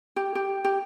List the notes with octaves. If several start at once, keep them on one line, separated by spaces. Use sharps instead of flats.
G4
G4
G4